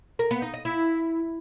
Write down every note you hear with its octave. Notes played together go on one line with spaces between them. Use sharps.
A#4
B3
D#4
D#5
E4